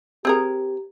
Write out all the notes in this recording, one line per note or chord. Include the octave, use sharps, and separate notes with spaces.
C4 G4 G#4 A#4